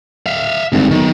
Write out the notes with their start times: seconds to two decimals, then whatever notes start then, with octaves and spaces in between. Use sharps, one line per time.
0.26 E5 F5
0.72 G#1 D2 G2
0.91 B1 D#3